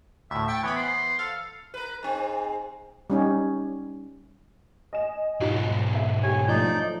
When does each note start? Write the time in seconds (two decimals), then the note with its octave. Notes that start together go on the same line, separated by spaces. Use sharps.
0.31 D2 A2 E5
0.48 G5 A6 C#7
0.63 E3 B3 C#5 B5
0.76 C5
1.19 A4 F5
1.74 A#4 B4
2.03 G#2 C4
3.10 G3 C#4 D#4
4.93 D#5 G#5 E7
5.41 B1 G#2 D#4 F4 F#4
5.95 E5
6.23 G4 C#5 G#5
6.48 F3 F#3 A3 D#4 D5 G6